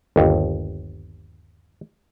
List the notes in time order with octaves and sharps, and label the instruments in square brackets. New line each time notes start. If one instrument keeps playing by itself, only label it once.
[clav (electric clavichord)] G1 D#2